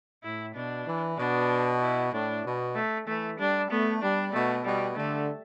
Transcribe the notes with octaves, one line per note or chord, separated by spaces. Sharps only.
A2 E4
B2 D4
E3
B2 D4
E4
A2 D4
B2
A3
E3 A3
G3 D4
A3 B3
G3 D4
B2 A3
B2 G3
D3 A3